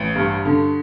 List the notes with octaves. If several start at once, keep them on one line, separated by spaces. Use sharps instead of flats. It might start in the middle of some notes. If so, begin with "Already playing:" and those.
Already playing: A1
G2
D3